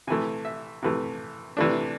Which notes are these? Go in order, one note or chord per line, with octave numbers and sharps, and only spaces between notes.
C3 E3 A3 G#5
E5
C3 E3 A3
C3 E3 A3 D4